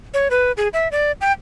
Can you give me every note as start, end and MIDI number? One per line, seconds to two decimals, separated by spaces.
0.14 0.28 73
0.31 0.52 71
0.57 0.68 68
0.73 0.90 76
0.92 1.12 74
1.21 1.32 79